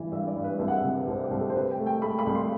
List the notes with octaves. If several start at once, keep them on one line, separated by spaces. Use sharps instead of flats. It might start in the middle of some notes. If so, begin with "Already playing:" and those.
Already playing: G2 E3
G2 E5
D5
G2
B4
C2 E5
F#5
E5
C3
B4
C2 C5
G4
C2
A4
C5
C2 B4
G5
A3
G5
A3 B5
B5
C2
C6